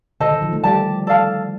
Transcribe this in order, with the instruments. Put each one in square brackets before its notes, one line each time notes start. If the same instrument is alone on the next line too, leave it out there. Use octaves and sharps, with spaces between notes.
[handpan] D3 [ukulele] A4 C5 D#5
[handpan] D#3
F3
A3
[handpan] G3 [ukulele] G4 D5 A5
[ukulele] A4 D5 F5 A5